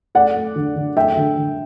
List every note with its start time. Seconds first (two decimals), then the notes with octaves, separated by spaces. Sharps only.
0.15 A3 D5 F#5
0.35 A3
0.56 D3
0.76 D3
0.96 A3 E5 G5
1.17 D3
1.37 D3